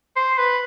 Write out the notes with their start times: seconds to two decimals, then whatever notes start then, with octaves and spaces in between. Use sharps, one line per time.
0.16 C5
0.38 B4